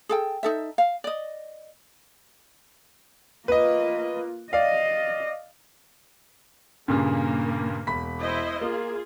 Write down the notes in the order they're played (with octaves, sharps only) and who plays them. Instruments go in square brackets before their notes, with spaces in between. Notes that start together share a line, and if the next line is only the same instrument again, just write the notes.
[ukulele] G#4 A4 G5
D#4 A4 E5
F5
D5 D#5
[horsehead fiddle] A#3 F4 [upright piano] B4 D#5
[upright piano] D5 F5 [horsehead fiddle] D#5
[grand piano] G2 A#2 C#3 [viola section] A#3
[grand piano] E1 B5 B6
[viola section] E4 C5 D#5
[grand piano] A#3 [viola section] F4 G#4